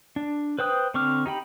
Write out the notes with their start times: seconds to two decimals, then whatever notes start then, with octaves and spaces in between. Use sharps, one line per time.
0.16 D4
0.59 B4 C5 G5 D#6 F#6
0.94 D3 C4 C#6 D6 F6
1.26 D#4 G4 G5 B5